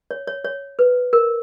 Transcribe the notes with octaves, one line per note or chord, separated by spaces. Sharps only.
C#5
C#5
C#5
B4
A#4